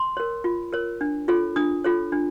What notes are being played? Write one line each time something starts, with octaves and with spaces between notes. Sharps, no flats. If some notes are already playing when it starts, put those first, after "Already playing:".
Already playing: C6
A#4 C#5
F4
A#4 C#5
D4
F4 A4 C#5
D4 D#6
F4 A4 C#5
D4